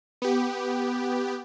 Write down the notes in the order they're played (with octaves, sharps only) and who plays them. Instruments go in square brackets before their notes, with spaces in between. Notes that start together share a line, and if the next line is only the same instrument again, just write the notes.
[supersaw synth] B3 G4